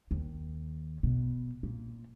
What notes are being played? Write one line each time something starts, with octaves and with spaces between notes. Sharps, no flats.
D#2
B2
A#2